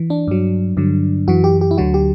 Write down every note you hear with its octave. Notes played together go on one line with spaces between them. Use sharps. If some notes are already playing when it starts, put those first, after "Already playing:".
Already playing: E3
D4
G2 F#3
G2 D3 F#3
F#2 E3 F#4
G4
G4
E4
D2 D3 F#3 F#4
G4